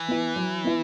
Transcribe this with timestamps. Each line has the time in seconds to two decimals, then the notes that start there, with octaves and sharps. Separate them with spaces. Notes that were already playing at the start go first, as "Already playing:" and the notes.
Already playing: E3
0.08 B3 E4
0.36 F#3
0.64 B3 E4